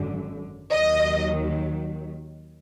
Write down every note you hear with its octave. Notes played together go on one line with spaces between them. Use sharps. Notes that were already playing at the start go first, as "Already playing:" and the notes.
Already playing: G#1 F#2 D3
D#2 D#3 F#3 D#5